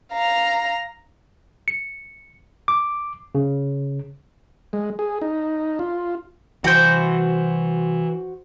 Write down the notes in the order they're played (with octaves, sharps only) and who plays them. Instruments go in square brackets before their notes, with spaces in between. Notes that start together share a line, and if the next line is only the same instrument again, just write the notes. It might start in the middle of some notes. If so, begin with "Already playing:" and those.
[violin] F5 A#5
[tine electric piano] C#7
D6
C#3
[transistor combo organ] G#3
G#4
D#4
F4
[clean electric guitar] C2 F#5 G5 [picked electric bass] E3 [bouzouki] F#4 C5